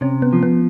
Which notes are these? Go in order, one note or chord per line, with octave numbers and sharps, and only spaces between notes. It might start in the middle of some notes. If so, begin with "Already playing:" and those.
C3 C#4
B3
F3
B3